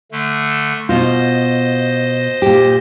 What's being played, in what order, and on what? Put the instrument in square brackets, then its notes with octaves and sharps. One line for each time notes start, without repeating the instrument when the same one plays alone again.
[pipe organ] D3 A3
[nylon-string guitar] B2 F4 [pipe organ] C5 D#5
[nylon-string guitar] A#2 G4